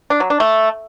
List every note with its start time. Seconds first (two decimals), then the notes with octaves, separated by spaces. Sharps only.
0.10 D4
0.20 F#3
0.30 D4
0.40 A3